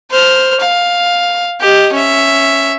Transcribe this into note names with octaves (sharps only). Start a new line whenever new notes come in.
C5 F6
F5
G4 D#5
C#4 E5